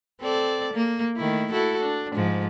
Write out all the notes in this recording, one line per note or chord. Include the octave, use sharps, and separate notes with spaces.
C4 A4 D5
A#3
D#3 A3 E4
E4 F#4 A4
D4
G#2 F3